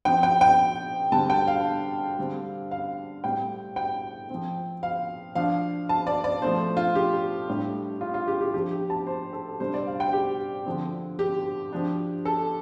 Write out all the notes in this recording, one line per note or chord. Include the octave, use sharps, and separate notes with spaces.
F3 C4 G5
G5
G5
D3 G3 C4 A5
G5
F5
D3 G3 C4
F5
A2 G3 C4 G5
G5
F3 C4
F5
F3 D4 F5
A5
D5
D5
F3 A3 C4 C5
F4
G4
A2 G3 D4
F4
F4
G4
G4
F3 D4 G4
G4
A5
C5
A4
C3 G3 D4 C5
D5
F5
G5
G4
D3 F3 C4
G4
F3 D4
A4